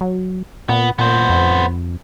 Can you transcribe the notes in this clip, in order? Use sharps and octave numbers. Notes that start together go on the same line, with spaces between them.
F#3
A#2 B3
A#2 B3 C5
F2